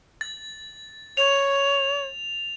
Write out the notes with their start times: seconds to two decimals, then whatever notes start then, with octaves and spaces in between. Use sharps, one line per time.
0.21 A6
1.17 C#5 F7